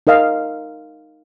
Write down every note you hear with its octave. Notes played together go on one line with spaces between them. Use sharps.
D#4 A#4 D#5 F5